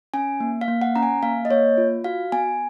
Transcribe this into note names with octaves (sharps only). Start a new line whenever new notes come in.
C#4 G#5
A#3
F5
A#3
F#5
C#4 A#5
G#5
A#3 F5
D#5
A#3 C#5
F4
F#4 F5
B3 G#5